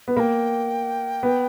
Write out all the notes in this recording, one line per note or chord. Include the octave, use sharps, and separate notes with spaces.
B3
A#3 G5 B5
B3